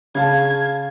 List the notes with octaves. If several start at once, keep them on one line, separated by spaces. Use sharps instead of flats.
C#3 F5 A5 G#6